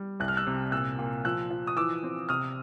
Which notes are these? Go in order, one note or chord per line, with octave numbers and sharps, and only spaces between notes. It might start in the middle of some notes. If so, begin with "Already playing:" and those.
Already playing: G3
C2 F#6
F6
E6 F#6
C3
A#2 E6 F#6
A#2
F3 E6 F#6
F3
D#6
E3 D6 E6
C4
C3 D#6 F6